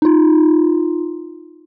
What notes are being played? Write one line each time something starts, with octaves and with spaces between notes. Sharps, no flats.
D#4 F4